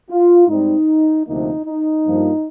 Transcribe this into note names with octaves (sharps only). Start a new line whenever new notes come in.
F4
G#2 G3 C4 D#4
D2 C3 F3 A#3 D#4
D#4
G2 F3 A#3